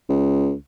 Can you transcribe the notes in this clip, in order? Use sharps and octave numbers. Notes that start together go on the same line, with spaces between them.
C#2